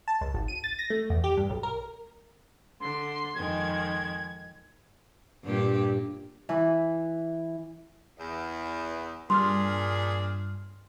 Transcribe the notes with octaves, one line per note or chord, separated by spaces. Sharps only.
A5
C#2
G#1
D#7
A6
A#6
A3
E2
G4
G2
B1
A#4
D3 C6
F2 D#3 G#3 G#6
G2 A#2 G4
E3
E2
G2 A#2 D4 G#4 C6 F6